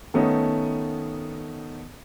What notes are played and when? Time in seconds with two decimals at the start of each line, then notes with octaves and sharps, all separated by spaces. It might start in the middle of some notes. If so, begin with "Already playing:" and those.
0.14 D#3 A3 B3 C#4 D#4